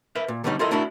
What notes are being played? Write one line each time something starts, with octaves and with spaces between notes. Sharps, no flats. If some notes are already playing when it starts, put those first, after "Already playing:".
A#4 B4 E5
A#2
D3 G3 B3 C#4 D#4
E4 F4 A4 A#4 D#5
A3 D4 E4 F#4 A#4